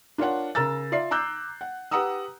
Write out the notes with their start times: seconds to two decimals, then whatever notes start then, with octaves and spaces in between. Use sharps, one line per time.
0.18 D4 F4 A#4 C#5 F#5
0.55 C#3 A#4 A#5 E6 A6
0.92 F4 D5 E5 C7
1.11 A#5 D6 E6 F#6 G6
1.61 F#5
1.91 G4 B4 F#5 A#5 D#6 E6